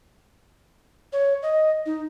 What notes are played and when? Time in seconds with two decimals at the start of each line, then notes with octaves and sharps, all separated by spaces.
1.13 C#5
1.42 D#5
1.86 D#4